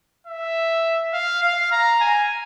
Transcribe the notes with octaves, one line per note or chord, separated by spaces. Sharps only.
E5
F5
F5
A#5
G#5